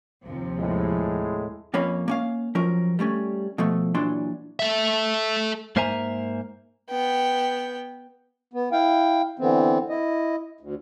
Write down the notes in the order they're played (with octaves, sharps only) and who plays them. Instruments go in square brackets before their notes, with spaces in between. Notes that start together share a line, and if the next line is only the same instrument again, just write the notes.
[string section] D#2 C3 F3
[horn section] A2 G#3
[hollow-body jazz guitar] F2 A#3 C#4 C#5 B5
A#3 C#4 F5
F3 F#3 C#4 A#4
G3 A3 A#3 C#4
B2 F3 A3
A#2 E3 F#3 D4 C6
[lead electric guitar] A4 E5
[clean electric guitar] G#2 A#3 C5 E5 G#5 A#5
[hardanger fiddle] B3 G5
[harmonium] B3
E4 F5 G5
D3 E3 B3 C4
E4 D#5
D2